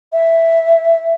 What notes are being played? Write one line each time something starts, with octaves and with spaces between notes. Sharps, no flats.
E5